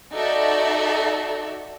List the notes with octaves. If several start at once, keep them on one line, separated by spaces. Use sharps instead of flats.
D#4 F#4 A4 D5 E5